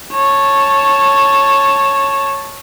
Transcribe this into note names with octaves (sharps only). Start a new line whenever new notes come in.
C#5 A5